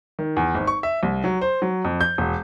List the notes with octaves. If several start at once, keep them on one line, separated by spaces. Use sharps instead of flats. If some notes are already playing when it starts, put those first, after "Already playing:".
D#3
E2
G#1
C#6
E5
C2
F#3
C5
F#3
F2
G6
E1